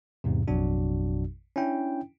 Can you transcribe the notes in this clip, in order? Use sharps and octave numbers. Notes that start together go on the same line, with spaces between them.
E2 G#2 C3
A1 F2 B2 F#3 D4 F#4
C#4 D4 E4 G5